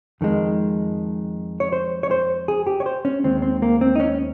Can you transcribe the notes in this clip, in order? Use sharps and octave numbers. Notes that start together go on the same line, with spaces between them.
F2 D#3 G#3
C#5
C5
C#5
C5
G#4
G4
C#5
C5
C#4
D#2 D#3 G#3 C4
C4
A#3
C4
D#4
C#4